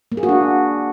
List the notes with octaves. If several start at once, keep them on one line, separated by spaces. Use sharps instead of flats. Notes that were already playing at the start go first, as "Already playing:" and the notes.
A#3
G#4
F#4
D4